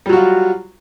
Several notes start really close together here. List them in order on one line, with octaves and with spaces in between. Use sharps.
G3 F#3 F#4 F4